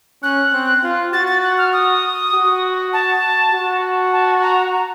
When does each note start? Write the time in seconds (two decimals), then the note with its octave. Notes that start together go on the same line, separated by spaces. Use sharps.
0.23 C#4 F#6
0.53 C4
0.83 F4
1.12 F#4 A6
1.28 A6
1.43 F#6
1.58 F6
1.73 D#6
2.32 F#4
2.93 A5
3.53 F#4
4.13 A5
4.42 A#5
4.72 A#5